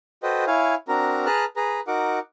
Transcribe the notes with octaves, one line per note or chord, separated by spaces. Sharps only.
F#4 A4 B4 C5 D#5 G5
E4 C#5 F5 G#5
C4 D4 F#4 A#4 A#5
G#4 B4 A5 A#5 F6 F#6
G#4 B4 A#5
D#4 F#4 A#4 F#5 D6